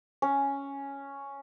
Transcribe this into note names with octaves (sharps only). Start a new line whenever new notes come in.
C#4